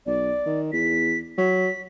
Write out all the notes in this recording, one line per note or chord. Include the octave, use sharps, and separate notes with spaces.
B1 D5
D#3
E2 B6
F#3 B6